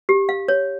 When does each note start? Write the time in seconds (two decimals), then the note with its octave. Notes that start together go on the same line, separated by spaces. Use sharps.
0.09 G4
0.29 F5
0.48 C#5